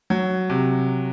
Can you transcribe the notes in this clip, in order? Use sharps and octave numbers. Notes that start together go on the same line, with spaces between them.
F#3
C3